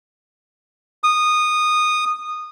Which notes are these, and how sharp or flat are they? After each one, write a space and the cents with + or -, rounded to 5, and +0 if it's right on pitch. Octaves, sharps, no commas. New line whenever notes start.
D#6 -15